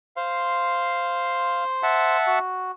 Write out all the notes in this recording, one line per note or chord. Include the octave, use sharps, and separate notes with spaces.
C5 F5 C6
E5 F#5 A5
F#4